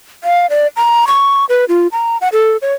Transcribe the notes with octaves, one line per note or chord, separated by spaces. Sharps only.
F5
D5
A#5
C#6
B4
F4
A#5
F#5
A4
C#5